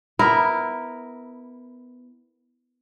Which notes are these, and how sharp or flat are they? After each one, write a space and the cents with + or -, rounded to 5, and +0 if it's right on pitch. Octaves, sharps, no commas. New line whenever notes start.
B3 +10 E4 -10 A#4 +0